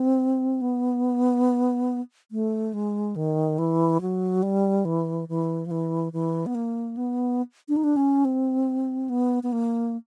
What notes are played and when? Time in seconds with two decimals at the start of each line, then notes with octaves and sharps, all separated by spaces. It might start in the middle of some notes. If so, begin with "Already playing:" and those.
Already playing: C4
0.61 B3
2.31 A3
2.73 G#3
3.16 D#3
3.58 E3
4.01 F#3
4.43 G3
4.85 E3
5.29 E3
5.66 F3
5.71 E3
6.13 E3
6.46 B3
6.55 A#3
6.97 B3
7.68 D4
7.76 D#4
7.84 D4
7.96 C#4
8.25 C4
9.09 B3
9.43 B3
9.52 A#3